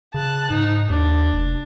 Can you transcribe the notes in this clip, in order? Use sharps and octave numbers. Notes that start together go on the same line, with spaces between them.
C#3 A5 F#6
G#2 D#4
D#2 D4
F1